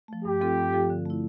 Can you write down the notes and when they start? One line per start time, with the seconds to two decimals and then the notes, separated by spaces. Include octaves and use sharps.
0.08 F3 A3
0.25 G2 G4
0.41 F3 C4 F4 A4
0.57 G2
0.73 F3 C4 F4 A4
0.90 D3
1.06 A3 E4